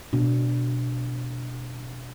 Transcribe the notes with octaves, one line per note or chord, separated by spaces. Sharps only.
B2 D4